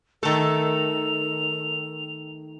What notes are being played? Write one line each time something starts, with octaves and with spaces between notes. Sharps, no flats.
D#3 A3 A4 A#4 F7